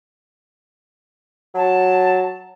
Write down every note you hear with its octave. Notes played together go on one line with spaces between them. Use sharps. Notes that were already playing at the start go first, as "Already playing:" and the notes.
F#3 A5